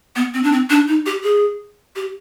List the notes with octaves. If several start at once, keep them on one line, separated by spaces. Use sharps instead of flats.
B3
C4
D4
C4
D4
D#4
G4
G#4
G4